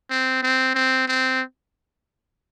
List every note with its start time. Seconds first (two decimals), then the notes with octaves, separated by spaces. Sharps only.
0.10 C4
0.43 C4
0.75 C4
1.08 C4